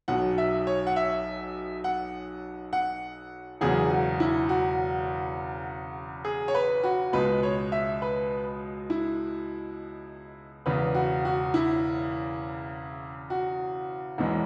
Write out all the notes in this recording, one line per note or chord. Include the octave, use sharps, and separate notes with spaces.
B1 B2 F#3 F#5
E5
C#5
F#5
E5
F#5
F#5
E1 E2 C#3 F#3 G#4
F#4
E4
F#4
G#4
C#5
B4
F#4
C#2 B2 G#3 B4
C#5
E5
B4
E4
E1 E2 C#3 B4
F#4
F#4
E4
F#4
E1 E2 E3 G#3